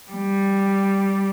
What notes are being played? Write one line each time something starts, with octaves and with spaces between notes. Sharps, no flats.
G3